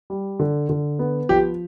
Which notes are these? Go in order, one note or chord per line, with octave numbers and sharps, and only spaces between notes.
G3
D3
D3
B3
F3 G4